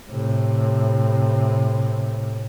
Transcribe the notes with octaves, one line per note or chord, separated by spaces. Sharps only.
A2 C3